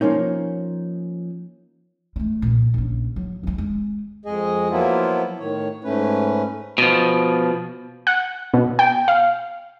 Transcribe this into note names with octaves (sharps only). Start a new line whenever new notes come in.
F3 A#3 C#4 D#4
G#3 A3
C2 A#2
A#1 C#3
F#3
F2 G#3
G#3
F2 G#3 G#4 D#5
F3 F#3 A#3 B3 E4 F4
A2 D#3 C#5
G#2 A3 C#4 B4
B2 F3
F#5
B2
G5
F5